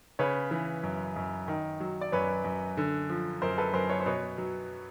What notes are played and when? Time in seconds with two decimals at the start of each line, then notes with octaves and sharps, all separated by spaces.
0.19 C#3 B4 C#5
0.51 E3
0.83 F#2
1.16 F#2
1.48 D#3
1.80 F#3
2.01 D5
2.12 F#2 B4 C#5
2.44 F#2
2.77 D3
3.09 F3
3.42 F#2 A#4 C5
3.58 A4 B4
3.73 F#2 A#4 C5
3.89 B4 C#5
4.00 C5
4.06 B2 B4 C#5
4.38 F#3